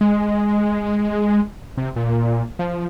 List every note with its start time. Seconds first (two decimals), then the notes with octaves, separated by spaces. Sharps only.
0.01 G#3
1.77 C3
1.96 A#2
2.59 F3